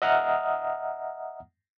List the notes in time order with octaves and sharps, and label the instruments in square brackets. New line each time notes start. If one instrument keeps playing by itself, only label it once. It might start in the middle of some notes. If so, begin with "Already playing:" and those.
[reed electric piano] D#5 E5 F#5 A#5 D#6 F6